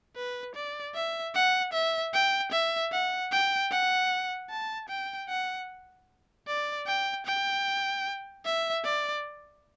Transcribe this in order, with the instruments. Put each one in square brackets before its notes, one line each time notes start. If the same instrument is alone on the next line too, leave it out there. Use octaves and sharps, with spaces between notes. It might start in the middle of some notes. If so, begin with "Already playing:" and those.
[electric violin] B4
D5
E5
F#5
E5
G5
E5
F#5
G5
F#5
A5
G5
F#5
D5
G5
G5
E5
D5